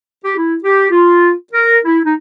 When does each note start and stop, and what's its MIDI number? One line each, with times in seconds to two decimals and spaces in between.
0.24 0.32 67
0.36 0.56 64
0.64 0.87 67
0.91 1.33 65
1.53 1.78 70
1.85 1.99 64
2.05 2.14 63